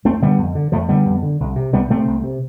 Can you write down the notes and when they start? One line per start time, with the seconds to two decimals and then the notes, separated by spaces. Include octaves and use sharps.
0.05 F2 A3 C4
0.22 D3 G3 B3
0.38 F2
0.55 D3
0.72 F2 F3 A3
0.89 D3 G3 B3
1.06 F2
1.23 D3
1.40 C2
1.56 C3
1.73 C2 G3 B3
1.90 C3 A3 C4
2.07 C2
2.24 C3